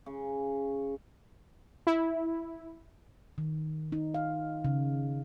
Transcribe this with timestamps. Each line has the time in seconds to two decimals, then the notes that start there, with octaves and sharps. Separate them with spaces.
0.06 C#3
1.87 E4
3.38 D#3
3.92 D#4
4.14 F5
4.64 C#3